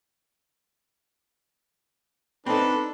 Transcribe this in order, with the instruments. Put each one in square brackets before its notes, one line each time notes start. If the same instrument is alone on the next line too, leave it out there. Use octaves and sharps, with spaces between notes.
[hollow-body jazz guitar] C4 D#4 [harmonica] D4 B4 [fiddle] A4